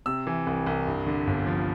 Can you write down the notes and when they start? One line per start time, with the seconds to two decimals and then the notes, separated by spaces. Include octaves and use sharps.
0.06 C3 E6
0.27 E3
0.47 C2
0.66 C2
0.87 G2
1.06 D3
1.27 G1
1.47 F3